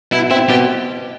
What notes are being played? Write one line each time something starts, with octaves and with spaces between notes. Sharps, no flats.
B2 E4
C4 E4
B2 G4